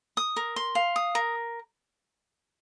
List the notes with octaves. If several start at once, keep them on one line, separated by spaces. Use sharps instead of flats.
D#6
A#4
C6
F5
D#6
A#4